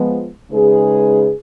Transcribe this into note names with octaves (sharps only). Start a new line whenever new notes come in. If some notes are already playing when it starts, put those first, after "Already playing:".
Already playing: F3 G#3 B3
C#3 G#3 D#4 G#4 B4